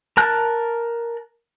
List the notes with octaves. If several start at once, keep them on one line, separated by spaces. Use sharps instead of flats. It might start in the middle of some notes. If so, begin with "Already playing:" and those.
A#4 A5 F#6